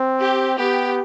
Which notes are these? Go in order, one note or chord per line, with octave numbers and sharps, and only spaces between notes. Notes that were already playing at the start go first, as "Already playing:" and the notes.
Already playing: C4
G4
B3 G4